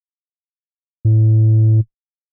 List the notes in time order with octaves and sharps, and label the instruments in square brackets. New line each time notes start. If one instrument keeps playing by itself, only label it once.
[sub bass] A2